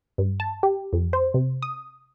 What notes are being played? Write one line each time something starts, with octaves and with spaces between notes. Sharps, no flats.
G2
A5
G4
F2
C5
C3
D#6